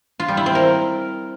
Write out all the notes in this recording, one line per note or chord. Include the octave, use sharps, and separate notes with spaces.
F4
G3
E4
C4
A#4